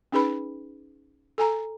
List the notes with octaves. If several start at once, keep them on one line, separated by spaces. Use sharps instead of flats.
C#4 D#4 G#4 B4 B5
A4 G#5 A#5